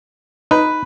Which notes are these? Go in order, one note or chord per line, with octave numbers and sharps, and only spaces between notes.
D#4 B4